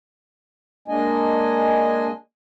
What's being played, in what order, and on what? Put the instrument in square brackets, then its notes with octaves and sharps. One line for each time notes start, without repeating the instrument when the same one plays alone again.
[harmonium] G#3 A#3 D4 D#5 G#5